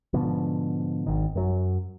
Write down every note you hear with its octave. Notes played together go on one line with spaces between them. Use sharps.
G#2 B2 D3 F3
G#1 D#3
F#2 F#3